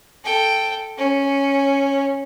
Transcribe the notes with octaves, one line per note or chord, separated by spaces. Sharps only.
A4 G5
C#4